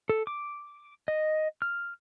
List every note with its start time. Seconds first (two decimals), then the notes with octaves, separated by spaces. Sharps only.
0.09 A4
0.27 D6
1.08 D#5
1.62 F6